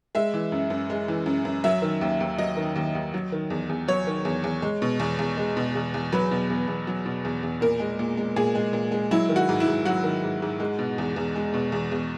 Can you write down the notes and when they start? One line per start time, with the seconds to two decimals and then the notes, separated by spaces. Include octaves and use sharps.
0.15 G#3 E5
0.34 E3
0.52 F#2
0.70 F#2
0.90 G#3
1.08 E3
1.26 F#2
1.45 F#2
1.64 F#3 E5
1.82 D#3
2.01 D#2
2.21 D#2
2.38 F#3 D#5
2.57 D#3
2.76 D#2
2.95 D#2
3.14 F#3
3.32 D#3
3.50 E2
3.69 E2
3.88 F#3 C#5
4.07 D#3
4.25 E2
4.44 E2
4.62 G#3
4.82 B2
5.00 E2
5.19 E2
5.37 G#3
5.57 B2
5.75 E2
5.94 E2
6.12 F#3 B4
6.31 B2
6.50 E2
6.68 E2
6.87 F#3
7.06 B2
7.25 E2
7.43 E2
7.61 A#2 A#4
7.80 G#3
7.99 A#2
8.17 G#3
8.36 A#2 G#4
8.55 G#3
8.73 A#2
8.92 G#3
9.11 F#3 E4
9.29 D#3
9.36 F#4
9.49 G#2
9.60 E4
9.68 G#2
9.85 F#3 F#4
10.04 D#3
10.24 G#2
10.42 G#2
10.60 G#3
10.79 B2
10.98 E2
11.16 E2
11.36 G#3
11.54 B2
11.72 E2
11.92 E2